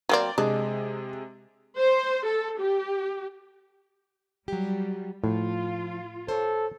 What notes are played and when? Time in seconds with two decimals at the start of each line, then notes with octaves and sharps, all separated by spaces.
0.09 F#3 A#3 C4 D5 G5 A#5
0.38 C3 G#3 D4 G#4 D#5
1.79 C5
2.26 A4
2.59 G4
4.48 F#3 G3 G4
5.24 A2 F3 F4
6.28 A4 C5 C#5